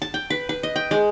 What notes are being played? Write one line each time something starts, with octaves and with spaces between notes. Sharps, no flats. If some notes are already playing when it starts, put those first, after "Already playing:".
A5
G5
B4
B4
D#5
G5
G#3